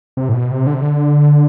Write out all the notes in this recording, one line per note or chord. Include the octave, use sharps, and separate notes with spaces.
C3
A2
B2
C3
D3
C3
D3